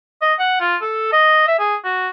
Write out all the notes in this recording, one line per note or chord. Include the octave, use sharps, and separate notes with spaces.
D#5
F#5
F4
A4
D#5
E5
G#4
F#4